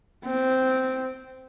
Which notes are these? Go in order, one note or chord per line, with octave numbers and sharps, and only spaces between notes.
C4